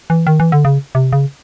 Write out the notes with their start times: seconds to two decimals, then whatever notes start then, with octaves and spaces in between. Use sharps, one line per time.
0.10 E3
0.27 D#3
0.40 E3
0.52 D3
0.65 C#3
0.95 C3
1.13 C#3